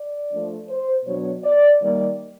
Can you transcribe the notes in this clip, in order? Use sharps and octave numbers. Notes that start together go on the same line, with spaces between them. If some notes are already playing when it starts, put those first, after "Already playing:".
Already playing: D5
F3 A3 D4
C5
B2 F#3 B3 D4 C#5
D5
D#3 G3 A#3 D5